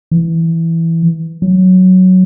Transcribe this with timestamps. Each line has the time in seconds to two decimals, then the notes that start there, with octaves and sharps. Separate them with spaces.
0.11 E3
1.42 F#3